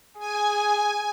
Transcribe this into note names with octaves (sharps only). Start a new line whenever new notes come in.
G#4 G#5